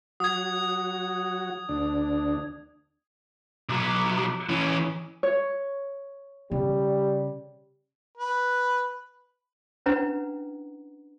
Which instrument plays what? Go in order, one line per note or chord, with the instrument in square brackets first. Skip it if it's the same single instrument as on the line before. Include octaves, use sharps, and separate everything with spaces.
[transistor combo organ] F#3 F#4 [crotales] D#6 G#6
[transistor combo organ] D2 D4
[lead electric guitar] B1 F#3
E3 C#4
[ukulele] C#5
[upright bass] C#3 [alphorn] G3
[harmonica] B4
[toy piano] C#4 D4 E4 B4 F#5 A#5